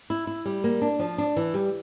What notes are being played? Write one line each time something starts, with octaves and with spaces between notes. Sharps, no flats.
E4
E4
G3
A#3
D4
F3
D4
E3
G3